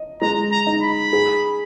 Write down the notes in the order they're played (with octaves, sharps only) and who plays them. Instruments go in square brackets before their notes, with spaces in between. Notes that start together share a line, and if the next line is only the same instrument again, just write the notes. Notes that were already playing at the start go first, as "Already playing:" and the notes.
Already playing: [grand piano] D#5
[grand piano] G#3 [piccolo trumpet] A#5
[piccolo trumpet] A#5
[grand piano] D#4
[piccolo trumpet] B5
[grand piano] G#4